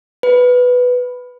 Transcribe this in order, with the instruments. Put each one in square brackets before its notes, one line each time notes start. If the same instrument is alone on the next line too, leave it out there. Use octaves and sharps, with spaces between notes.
[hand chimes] B4